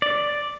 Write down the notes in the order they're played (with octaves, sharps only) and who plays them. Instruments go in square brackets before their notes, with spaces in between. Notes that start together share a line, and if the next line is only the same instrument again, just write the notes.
[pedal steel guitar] D5